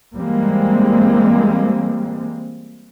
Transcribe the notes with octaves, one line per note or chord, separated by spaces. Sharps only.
E3 G3 G#3 A#3 C4